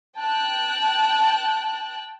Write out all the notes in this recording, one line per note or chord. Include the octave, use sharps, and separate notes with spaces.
G5 A5 F#6